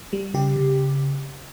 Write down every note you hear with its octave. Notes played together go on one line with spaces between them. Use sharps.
G3
C#3 G4
C#3